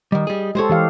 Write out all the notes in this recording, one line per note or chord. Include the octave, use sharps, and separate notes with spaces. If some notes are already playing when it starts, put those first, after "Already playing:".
D#3 G3 D#5
G3 G#4
G#3 G4 A4 C5 C#5
E3 G4 F5